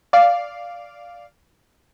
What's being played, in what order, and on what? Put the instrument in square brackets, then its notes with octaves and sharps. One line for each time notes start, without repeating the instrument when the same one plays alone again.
[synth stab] D5 F5